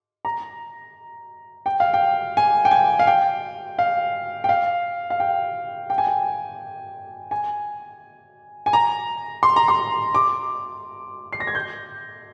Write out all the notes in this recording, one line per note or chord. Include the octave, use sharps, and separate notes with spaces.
A#5
G5
F5
G5
G#5
G5
G#5
F5
G5
F5
G5
F5
F5
G5
G5
G#5
G5
G#5
G#5
A#5
C6
A#5
C6
D6
C7
A#6
G#6
G6